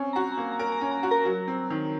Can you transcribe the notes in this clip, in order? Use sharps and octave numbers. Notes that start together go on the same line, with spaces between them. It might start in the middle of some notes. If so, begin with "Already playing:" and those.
Already playing: C4 C#4
F#4 A#5
A#5
A#3
A#5
A#4
A#5
C#4
A#5
F#4
A#4 A#5
F#3
C4
D#3